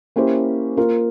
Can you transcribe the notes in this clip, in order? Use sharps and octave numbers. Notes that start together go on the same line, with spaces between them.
A#3 C#4 E4 G4 C5
A#3 F4 A#4